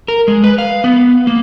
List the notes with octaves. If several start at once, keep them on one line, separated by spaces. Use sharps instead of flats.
A#4
G#3
B4
F5
B3
A#3